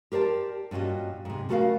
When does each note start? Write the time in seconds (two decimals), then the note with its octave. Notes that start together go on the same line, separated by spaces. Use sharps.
0.12 G4 A#4 C5 D5 A5
0.71 G2 A#2 C#4 F#4 D#5
1.25 G#2 C3
1.49 C#3 A3 F#4 A4 A#4 F5